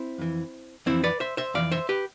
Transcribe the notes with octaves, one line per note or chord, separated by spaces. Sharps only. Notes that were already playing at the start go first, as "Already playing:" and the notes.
Already playing: C4 E4
F2 E3
F2 E3 C4 E4
B4 D5
C5 E5
C5 E5
F2 E3 D5 F5
C5 E5
G4 B4